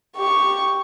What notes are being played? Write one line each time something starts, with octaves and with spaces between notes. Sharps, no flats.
G4 C#6